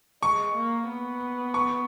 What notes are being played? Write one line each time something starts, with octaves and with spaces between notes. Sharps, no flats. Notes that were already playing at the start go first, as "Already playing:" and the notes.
G#3 C#6
A#3
B3
C#6